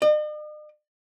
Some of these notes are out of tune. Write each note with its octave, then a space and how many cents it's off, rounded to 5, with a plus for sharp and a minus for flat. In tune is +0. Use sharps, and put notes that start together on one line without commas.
D#5 -45